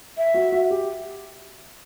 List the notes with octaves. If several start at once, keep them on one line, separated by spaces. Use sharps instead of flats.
E5
F#4
F#4
G4